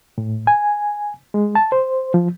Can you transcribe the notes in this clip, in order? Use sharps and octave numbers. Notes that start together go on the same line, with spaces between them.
A2
G#5
G#3
A5
C5
F3